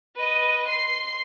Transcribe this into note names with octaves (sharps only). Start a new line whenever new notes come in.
B4 D#5
C6 C7